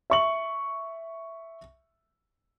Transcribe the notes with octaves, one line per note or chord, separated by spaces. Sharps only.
E5 C#6 F#7